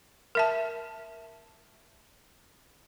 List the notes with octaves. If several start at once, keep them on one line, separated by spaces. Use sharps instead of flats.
A#4 E5 A5